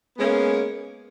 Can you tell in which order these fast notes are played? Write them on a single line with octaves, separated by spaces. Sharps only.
B3 G#3 C#4 A#3